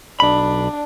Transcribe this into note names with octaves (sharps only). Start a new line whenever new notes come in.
B1 D4 B5